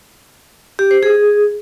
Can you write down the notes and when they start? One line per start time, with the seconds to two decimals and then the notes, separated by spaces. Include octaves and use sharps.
0.79 G4
0.91 C5
1.03 G#4